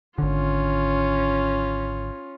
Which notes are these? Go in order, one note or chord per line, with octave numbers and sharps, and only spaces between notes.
G#1 D3 C#4 F4